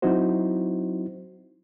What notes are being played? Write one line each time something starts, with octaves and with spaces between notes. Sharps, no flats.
F#3 C4 D#4 E4 F#4 C5